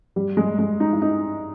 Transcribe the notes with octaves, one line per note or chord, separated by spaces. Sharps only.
G3
G#3
G#3
D#4
E4
D#4